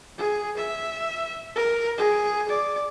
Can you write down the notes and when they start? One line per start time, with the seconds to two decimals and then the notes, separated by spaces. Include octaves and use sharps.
0.18 G#4
0.57 E5
1.56 A#4
1.98 G#4
2.48 D5